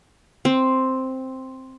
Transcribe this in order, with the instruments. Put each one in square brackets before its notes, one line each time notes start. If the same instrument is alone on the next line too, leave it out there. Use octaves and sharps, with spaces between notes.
[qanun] C4